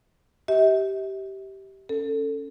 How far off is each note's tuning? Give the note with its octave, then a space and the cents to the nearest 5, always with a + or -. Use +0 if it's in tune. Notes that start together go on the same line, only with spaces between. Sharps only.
G4 -15 E5 -45
C#4 +0 A4 +15